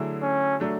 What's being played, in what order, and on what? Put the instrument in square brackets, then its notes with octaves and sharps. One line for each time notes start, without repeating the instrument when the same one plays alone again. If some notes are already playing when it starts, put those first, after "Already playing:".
Already playing: [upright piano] D3 F#3 A3 E4 G#4
[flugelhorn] C#4
[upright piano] F#3 A3 D4